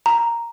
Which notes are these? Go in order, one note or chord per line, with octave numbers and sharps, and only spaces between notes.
A#5